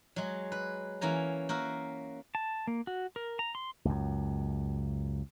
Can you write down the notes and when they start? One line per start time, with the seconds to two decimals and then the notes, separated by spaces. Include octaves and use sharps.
0.16 F#3 G#3
0.52 B4
1.01 E3 A#3 C#4 G#5 A#5
1.49 A#3 F#4 A#4 E5
2.35 A5
2.67 A#3
2.87 F#4
3.16 A#4
3.39 A#5
3.55 C6
3.85 C#2 F#2